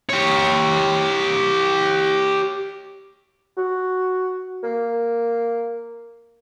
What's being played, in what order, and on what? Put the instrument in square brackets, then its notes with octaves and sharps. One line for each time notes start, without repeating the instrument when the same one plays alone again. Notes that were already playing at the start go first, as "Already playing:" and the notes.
[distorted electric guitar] G4 C#5
[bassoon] F#4
A#3